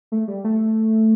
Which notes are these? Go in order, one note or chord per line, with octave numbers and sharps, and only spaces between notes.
A3
G3
A3